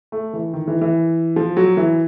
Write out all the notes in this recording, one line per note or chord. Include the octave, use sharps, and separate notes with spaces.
A3
E3
D#3
E3
E3
F3
F#3
E3